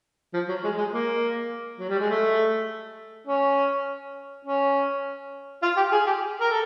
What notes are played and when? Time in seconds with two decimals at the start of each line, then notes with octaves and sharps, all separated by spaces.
0.34 F3
0.49 F#3
0.64 G#3
0.78 G#3
0.93 A#3
1.79 F#3
1.89 G3
1.99 G#3
2.10 A3
3.28 C#4
4.45 C#4
5.62 F4
5.77 G4
5.92 G#4
6.07 G4
6.41 A#4
6.50 A4